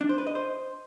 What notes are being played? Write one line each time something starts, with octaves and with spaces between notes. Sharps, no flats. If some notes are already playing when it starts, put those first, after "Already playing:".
D4
C5
B4
D#5
C5